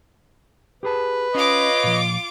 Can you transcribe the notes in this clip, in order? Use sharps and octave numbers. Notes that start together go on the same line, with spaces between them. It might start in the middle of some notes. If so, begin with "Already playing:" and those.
G4 G#4 B4 A5
C#4 F4 C#5 D#5 D6
A#2 F3